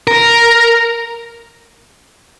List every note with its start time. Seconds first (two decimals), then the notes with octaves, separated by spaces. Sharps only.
0.07 A#4